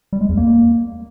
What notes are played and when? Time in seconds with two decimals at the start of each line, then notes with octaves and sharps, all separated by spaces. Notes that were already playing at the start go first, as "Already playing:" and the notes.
0.13 G3
0.21 G#3
0.29 E2
0.37 A#3